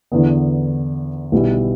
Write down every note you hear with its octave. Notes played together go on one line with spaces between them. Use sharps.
E2 D3 B3
B1 B2 G3 E4